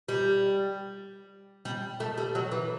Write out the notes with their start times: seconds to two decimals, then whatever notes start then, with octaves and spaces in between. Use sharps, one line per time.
0.08 G3
1.65 G3
2.00 A3
2.18 G3
2.35 F#3
2.52 E3